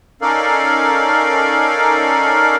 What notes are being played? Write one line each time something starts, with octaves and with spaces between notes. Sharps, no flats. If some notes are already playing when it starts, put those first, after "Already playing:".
C#4 D#4 A4 A#4 D5 F5